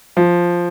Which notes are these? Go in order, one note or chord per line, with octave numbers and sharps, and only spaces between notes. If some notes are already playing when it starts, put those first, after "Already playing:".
F3